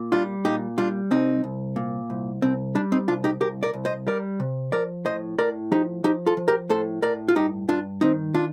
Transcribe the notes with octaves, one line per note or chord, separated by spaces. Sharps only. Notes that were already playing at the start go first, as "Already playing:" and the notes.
Already playing: A#2
G3 D4 F4
A#2 D#4 G4
G3 D4 F4
C2 C4 D#4
C2
A#2
C2
C2 C4
G3 D4
C4 D#4
C2 D4 F4
D#4 G4
C2 G4 A#4
A#4 D5
C2
C5 D#5
G3 A#4 D5
C3
F3 A#4 D5
A2 C5 D#5
A2 A#4 D5
F3 D#4 G4
F3 D#4 G4
F4 A4
F3
G4 A#4
A2 A4 C5
A2 A#4 D5
F4
G2 D#4 G4
G2 D4 F4
D#3 C4 D#4
D4 F4